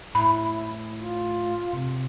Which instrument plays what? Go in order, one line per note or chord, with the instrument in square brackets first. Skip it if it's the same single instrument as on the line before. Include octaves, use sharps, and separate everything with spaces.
[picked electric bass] A2 [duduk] E4 [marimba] B5
[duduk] F4
[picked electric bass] C3